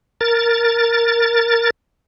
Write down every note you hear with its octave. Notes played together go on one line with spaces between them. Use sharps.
A#4 A6